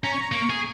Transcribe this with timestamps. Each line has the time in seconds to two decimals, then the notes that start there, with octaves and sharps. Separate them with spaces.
0.03 C#4 A#5
0.12 C#6
0.21 A#5
0.31 A#3 C#6
0.50 G#4